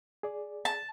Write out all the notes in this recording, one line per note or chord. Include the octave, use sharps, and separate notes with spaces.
G#4 D5
A5